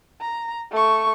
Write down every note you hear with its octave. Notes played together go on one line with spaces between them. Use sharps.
A#5
A3 C#6